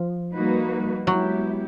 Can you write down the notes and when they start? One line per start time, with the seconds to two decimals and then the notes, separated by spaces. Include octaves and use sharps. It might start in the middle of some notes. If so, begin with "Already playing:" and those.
Already playing: F3
0.35 G3 A#3 D#4 F#4 B4
1.06 F#3 G#3 B3 E4 G4